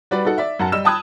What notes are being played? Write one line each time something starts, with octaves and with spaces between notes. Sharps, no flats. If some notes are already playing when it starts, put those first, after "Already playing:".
G3 F#4 B4 D5
D#4 F#4 A4 F#5
D5 E5
F#2 F#5 A5
G3 D#5 E6 E7
G5 A5 B5 D#6 F#6 G#6